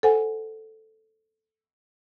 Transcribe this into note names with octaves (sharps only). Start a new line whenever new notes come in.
A4 C5 F#5 G#5